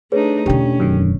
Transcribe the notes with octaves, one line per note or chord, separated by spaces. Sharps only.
A3 D4 D#4 G#4 B4 C#5
E1 D3 C#4 G4 G5
F#2 D#3